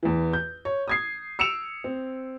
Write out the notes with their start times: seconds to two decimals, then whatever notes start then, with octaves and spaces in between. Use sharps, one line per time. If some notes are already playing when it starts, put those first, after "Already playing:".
0.03 E2 E3
0.33 G6
0.65 C#5
0.88 D#6 G#6 C7
1.39 E6 C#7 D7 E7 F7
1.84 C4